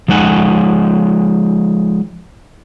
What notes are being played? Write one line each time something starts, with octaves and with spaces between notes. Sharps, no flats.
F3 G#3 D#4 F#5 G#5